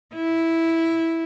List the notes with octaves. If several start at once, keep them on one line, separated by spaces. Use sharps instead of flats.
E4